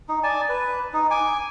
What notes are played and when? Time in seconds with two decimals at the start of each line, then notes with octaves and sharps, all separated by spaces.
0.09 D#4
0.23 D5 G#5 A5
0.49 B4
0.94 D#4
1.11 G#5 D6